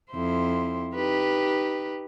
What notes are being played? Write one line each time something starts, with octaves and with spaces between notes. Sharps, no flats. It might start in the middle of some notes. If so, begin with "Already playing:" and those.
F2 E4 C5
D#4 G4 B4